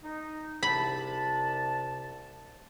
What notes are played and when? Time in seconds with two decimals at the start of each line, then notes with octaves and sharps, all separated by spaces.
0.03 D#4
0.63 C2 C3 A5 B5